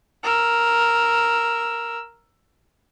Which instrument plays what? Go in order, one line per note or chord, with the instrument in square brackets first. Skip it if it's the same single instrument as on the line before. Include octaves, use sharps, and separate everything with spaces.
[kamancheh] A#4 E6